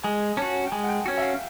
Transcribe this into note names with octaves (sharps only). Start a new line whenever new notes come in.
G#3 G#5
C#4 F#4 A5
G5
G#3 G#5
F#5
G5
C#4 F#4 F#5
E5
F5